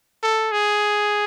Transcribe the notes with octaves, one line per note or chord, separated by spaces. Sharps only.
A4
G#4